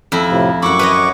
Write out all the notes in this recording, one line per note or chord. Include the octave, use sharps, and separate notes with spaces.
F2 E4
A2 C3 F3
F#2 E4 F#5 C#6 D6
B4 C#5 D#5